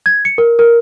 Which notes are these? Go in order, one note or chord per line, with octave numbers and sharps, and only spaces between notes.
G#6
C#7
A#4
A#4